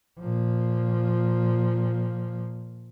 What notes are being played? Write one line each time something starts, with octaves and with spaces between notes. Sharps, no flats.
A#2 F3